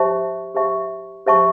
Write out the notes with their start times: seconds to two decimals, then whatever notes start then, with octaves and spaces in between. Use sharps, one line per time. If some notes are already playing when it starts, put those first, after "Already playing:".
Already playing: G4 C5 E5 A5 C#6
0.55 G4 C5 E5 A5 C#6
1.26 G4 C5 E5 A5 C#6